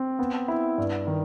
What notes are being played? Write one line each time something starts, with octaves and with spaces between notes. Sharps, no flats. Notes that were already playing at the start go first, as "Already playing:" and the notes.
Already playing: C4
B3
E4
G2
D#3